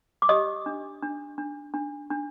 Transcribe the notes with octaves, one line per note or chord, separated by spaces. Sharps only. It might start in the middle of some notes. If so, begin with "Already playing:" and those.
D6
G4 D#5 D#6
D4
D4
D4
D4
D4